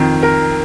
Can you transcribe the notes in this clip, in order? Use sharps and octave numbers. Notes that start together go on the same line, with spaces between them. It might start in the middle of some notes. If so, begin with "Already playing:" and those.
Already playing: F2 D#3
A#4